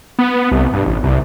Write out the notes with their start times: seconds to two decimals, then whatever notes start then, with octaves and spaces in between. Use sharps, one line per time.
0.19 B3
0.52 C2
0.73 G2
0.86 A1
1.03 C2